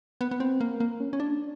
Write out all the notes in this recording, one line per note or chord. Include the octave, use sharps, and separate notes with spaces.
B3
B3
C4
A#3
A#3
C#4
C#4
D4